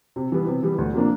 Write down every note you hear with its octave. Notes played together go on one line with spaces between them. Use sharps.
C3
E3 G3 B3
C3
E3 G3 B3
D2
C3 F3 A#3 D4